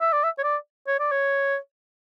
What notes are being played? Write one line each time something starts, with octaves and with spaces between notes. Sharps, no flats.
E5
D5
E5
C#5
D5
C#5
D5
C#5